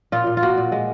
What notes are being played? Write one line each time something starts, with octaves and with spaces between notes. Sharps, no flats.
A#2 F4
A#2
F4
A#3 F#4
A#2
G#3